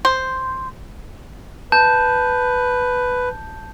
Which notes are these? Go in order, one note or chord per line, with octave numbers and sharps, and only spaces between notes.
C5
B4 A5 G6